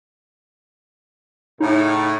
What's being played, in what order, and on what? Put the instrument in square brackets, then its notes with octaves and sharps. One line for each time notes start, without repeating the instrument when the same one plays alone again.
[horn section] A2 C#3 [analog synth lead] D#4